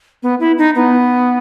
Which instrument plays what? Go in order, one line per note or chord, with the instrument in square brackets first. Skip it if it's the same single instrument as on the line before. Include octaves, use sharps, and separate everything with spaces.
[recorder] B3
E4
D#4
B3